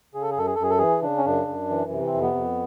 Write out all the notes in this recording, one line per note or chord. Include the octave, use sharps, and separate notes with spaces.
C#3 G#4
A4
G#4
F#2 A4
G#4
A4
F#2 G#4
A4
E3 G#4
C#3 D4
C#4
F#2 D4
F#2
E3
C3
C4
F2
B3
F2